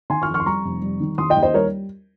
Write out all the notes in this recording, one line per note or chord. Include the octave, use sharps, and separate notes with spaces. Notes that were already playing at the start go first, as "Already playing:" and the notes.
D#3 G#5 C6
C#6 F6
F2
C#6 F6
C6
G3 A#5 C#6
F1
G3
D#3
D#2 C6 D#6
D#5 G5
D#2
C5 D#5
G3 A#4 C#5